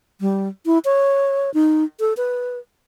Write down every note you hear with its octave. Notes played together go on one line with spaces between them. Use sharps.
G3
E4
C#5
D#4
A4
B4